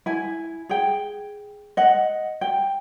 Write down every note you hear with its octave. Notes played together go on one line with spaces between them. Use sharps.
E4 G#5
G#4 G5
D#5 F#5
G5